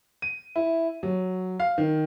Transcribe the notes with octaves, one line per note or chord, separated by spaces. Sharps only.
D#7
E4
F#3
F5
D#3